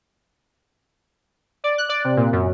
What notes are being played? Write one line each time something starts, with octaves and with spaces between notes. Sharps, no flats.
D5
F#6
D5
C3
A#2
F#2